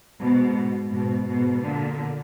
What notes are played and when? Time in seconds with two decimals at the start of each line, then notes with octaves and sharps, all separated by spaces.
0.20 G#2 B2
0.92 G#2 B2
1.27 G#2 B2
1.62 A#2 D3